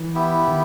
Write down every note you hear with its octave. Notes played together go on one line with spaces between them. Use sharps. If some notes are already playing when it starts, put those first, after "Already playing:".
Already playing: E3
B3 E4 G4
D#3